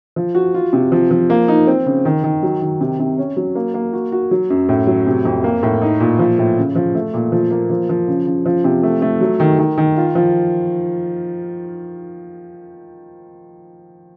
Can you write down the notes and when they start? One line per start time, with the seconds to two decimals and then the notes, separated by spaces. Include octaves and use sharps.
0.16 F3
0.35 F#4
0.55 F4
0.73 C3
0.92 F3
1.11 F3
1.30 A#3
1.48 D#4
1.67 C4
1.86 C#3
2.05 D#3
2.24 D#3
2.43 F#3
2.61 D#3
2.81 C3
2.99 C3
3.18 C#4
3.37 F#3
3.55 A#3
3.74 A#3
3.93 F#4
4.12 F#4
4.31 F#3
4.50 F#2
4.69 A2
4.87 F#3
5.07 C3
5.25 F2
5.44 A#3
5.63 A2
5.82 D#4
6.00 A#2
6.19 F3
6.39 A2
6.58 C#3
6.76 F3
6.95 A3
7.14 A#2
7.32 F3
7.51 A#3
7.70 F3
7.89 F3
8.08 C#3
8.26 C#3
8.46 F3
8.64 C3
8.83 A3
9.02 A3
9.21 F#3
9.40 D#3
9.59 D#3
9.78 D#3
9.97 F4
10.15 F3